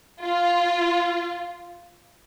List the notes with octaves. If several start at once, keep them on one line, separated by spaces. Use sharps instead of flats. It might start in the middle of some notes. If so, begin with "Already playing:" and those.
F4